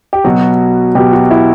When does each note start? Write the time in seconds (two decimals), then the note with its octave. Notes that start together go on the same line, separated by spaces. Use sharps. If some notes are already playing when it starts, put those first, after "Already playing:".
0.13 G4
0.24 B2 F#3 F#4
0.95 B2 F#3 G4
1.13 F#4
1.31 E4